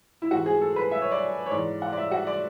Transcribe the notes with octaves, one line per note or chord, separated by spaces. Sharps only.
E4
G#2 E3 F#4
G#4
A4
B4
E5
C#5
D5
C#5
G#2 E3 D5
F#5
D5
E5
F#4
D5